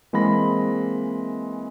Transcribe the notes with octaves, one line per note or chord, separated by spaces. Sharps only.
E3 G#3 A#3 C4 B5 A#6